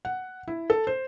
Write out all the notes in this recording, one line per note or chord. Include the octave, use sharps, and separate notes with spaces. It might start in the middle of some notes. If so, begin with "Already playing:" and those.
F#5
E4
A4
C5